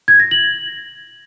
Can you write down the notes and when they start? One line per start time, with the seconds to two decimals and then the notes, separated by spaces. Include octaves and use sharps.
0.08 G#6
0.20 A#6
0.31 F#7